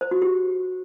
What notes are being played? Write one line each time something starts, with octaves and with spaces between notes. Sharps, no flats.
C5
F#4
G4